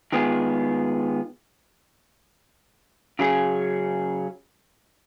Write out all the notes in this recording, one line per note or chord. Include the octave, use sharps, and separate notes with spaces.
D#3 G#3 B3 F4 G#4
C#3 F#3 C#4 G#4